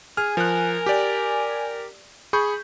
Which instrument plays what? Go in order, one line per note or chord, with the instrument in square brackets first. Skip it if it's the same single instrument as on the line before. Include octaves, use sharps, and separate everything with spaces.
[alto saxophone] G#4 [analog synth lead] G#5 [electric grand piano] F6
[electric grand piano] F3 F#6 [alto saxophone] A#4
[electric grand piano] G4 D5
[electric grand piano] G#4 C#6 G6 [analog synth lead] B5